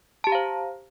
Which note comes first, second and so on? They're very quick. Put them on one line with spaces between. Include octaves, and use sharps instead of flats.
A5 G4 A#5 F5 C5